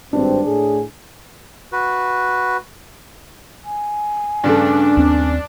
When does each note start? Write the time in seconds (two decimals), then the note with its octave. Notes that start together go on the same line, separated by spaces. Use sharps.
0.13 G#1 G2 C4 D4
0.46 A2 G#4
1.72 F#4 B4
3.65 G#5
4.43 G2 C#3 A3 D4
4.97 D#2 C4